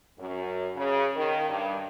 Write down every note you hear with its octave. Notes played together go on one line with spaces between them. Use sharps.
F#2
C#3
D#3
G2